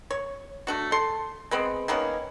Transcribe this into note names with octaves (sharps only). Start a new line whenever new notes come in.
C#5
A3 D4 F#4
A4 C6
G#3 B3 C4
D#3 A#3 B3 C#4